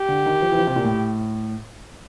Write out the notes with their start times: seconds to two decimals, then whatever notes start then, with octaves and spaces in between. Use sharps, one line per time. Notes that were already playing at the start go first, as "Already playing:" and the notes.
Already playing: G4
0.08 D3
0.26 D#3
0.42 F3
0.52 E3
0.59 F3
0.67 C3
0.76 A#2
0.84 A2